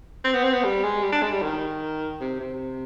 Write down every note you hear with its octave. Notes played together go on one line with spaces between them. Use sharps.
C4
B3
C4
B3
G3
G#3
G3
D4
G#3
G3
D#3
C3
C3